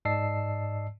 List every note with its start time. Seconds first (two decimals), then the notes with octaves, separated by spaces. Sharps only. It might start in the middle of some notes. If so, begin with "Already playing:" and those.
0.05 G#2 D5 D#5 A5 E6 C7